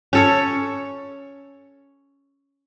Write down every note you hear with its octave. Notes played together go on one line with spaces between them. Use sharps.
C#4 A4 C#5